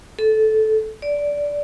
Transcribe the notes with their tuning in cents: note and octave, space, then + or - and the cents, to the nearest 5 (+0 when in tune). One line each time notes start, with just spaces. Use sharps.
A4 -15
D5 -10